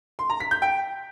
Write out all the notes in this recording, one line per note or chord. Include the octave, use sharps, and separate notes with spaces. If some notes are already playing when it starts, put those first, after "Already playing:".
C6
A#5
B6
G6
G5